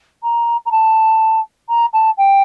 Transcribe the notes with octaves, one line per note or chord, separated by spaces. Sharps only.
A#5
A#5
A5
A#5
A5
G5